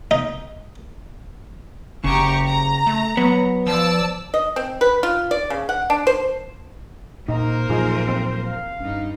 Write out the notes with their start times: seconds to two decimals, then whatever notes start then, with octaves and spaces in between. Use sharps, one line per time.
0.11 D#4
2.04 F#1 C#3 G4 A#5 C#6
2.47 A#5
2.87 A3
3.17 F#3 B3
3.67 F3 D5 A5 E6
4.34 D#5
4.56 C4
4.81 B4
5.03 F4
5.31 D5
5.50 C#3
5.69 F#5
5.90 D4
6.07 C5
7.28 A#2 A#3 D#4 A#4 C5
7.70 A#2 F3 F#3 D#4 F4 G#4
8.08 C4
8.46 F5
8.80 G2 C#4 D#4